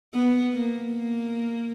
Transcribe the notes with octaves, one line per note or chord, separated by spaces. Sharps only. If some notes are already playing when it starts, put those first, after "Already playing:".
B3
A#3
A#3